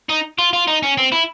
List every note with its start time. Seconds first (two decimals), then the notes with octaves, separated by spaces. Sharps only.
0.09 D#4
0.38 F4
0.53 F4
0.68 D#4
0.83 C#4
0.97 C4
1.12 E4